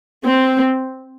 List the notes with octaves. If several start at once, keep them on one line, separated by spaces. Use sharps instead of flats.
C4